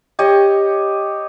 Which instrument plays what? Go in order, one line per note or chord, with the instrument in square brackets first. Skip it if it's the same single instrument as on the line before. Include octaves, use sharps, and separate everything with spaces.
[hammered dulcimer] G4 C#5 D#5